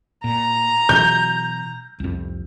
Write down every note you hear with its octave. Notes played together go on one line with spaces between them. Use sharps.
A#2 A#5
B2 E3 F#3 G6
C2 F2